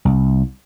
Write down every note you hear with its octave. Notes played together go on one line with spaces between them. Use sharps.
C2